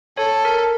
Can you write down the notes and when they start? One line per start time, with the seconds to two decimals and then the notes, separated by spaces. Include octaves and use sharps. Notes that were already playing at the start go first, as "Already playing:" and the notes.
0.17 A4 C#5
0.45 A#4